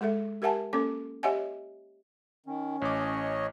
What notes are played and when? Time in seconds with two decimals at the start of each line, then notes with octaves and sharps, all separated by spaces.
0.01 G#3 G#4 A4 E5
0.42 G4 A#4 E5 F#5 G#5 A5
0.73 A#3 C#4 A4 D6
1.23 G4 C#5 D#5 E5 F#5 G#5
2.46 D#3 C#4
2.82 A1 C#5 D#5 D6